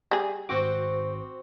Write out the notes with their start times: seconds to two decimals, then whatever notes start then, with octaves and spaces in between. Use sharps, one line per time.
0.11 G3 G#4
0.49 G#1 C4 F#4 C5 D6